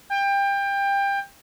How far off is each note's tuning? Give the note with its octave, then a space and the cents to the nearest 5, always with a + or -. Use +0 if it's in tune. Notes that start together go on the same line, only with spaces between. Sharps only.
G5 +25